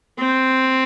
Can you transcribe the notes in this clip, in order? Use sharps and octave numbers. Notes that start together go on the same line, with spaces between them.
C4